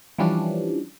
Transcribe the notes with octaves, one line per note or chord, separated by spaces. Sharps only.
E3 F3 G3 C#4 D4